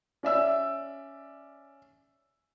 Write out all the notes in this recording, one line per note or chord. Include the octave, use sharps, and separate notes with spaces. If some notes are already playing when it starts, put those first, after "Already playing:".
C#4 D5 E5 E6